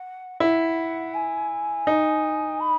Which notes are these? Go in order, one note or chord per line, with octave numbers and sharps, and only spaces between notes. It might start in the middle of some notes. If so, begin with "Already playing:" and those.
Already playing: F#5
E4 F#5
G#5
D#4
B5